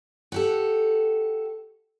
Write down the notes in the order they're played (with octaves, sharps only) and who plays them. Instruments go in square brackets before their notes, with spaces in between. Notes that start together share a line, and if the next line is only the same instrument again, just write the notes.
[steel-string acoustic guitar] F#4 G4 A4